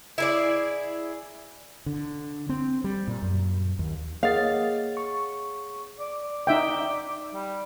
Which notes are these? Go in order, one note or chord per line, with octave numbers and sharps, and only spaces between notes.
E4 G#4 D5
D3
C4
G3
A#2
F#2
D#2
A#3 G#4 C#5 D#5 F5 F#5 A6
C#6
D5
D5
D#4 E5 G5
G3